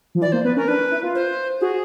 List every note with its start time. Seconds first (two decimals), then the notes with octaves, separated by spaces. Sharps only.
0.15 F3
0.21 E3 D5
0.32 A#3 C5
0.45 B3 B4
0.56 C#4 A#4
0.68 D4 B4
0.91 E4
1.03 F4
1.15 C5
1.61 F#4 G#4